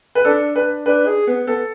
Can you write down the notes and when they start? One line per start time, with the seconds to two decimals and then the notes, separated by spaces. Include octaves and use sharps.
0.15 B4
0.25 D4 A4
0.56 D4 B4
0.86 D4 B4
1.06 G#4
1.27 B3
1.47 B3 A4